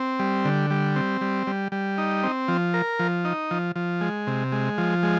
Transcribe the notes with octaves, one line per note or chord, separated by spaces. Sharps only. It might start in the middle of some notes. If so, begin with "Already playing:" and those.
Already playing: C4
G3
D3
G3
C4
G3
G3
G3
D#4
C4
F3
A#4
F3
D#4
F3
F3
G#3
C3
G#3
F3
G#3